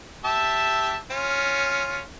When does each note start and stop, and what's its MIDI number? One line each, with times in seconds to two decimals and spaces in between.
0.24 0.96 67
0.24 0.96 76
0.24 0.96 81
1.11 2.02 61
1.11 2.02 65